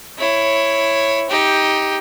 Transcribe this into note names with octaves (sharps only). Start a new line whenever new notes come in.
E4 C#5
D#4 G4